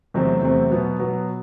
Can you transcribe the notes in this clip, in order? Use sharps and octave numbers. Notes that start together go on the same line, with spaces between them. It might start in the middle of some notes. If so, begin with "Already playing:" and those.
E2 C3 F#3 A3 C4
E2 C3 F#3 A3 C4
B2 F#3 B3 F#4
B2 F#3 B3 F#4